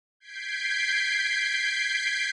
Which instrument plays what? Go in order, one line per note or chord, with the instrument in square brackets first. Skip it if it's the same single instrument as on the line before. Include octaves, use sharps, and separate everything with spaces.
[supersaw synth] G6 G#6 B6 C7 D7